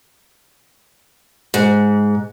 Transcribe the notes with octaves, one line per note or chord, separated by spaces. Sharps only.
G#2